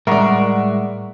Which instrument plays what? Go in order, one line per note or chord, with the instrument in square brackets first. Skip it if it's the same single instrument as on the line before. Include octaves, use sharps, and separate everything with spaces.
[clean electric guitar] A2 G#3 [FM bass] G3 [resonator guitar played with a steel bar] A#4 D5 [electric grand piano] E5 F#5 C#6